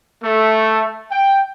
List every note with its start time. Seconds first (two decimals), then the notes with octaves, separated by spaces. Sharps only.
0.22 A3
1.10 G5